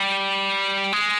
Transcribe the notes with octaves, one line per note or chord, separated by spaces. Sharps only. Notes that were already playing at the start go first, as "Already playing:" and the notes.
Already playing: G3
G#3